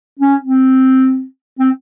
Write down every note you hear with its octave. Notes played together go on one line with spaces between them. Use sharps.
C#4
C4
C4